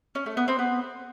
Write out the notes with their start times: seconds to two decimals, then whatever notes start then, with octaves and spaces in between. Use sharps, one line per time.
0.15 C#4
0.26 A3
0.37 B3
0.48 C4
0.59 B3